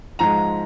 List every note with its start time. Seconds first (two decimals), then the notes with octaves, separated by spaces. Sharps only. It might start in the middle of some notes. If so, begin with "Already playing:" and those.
0.19 G#2 F3 G#3 A#5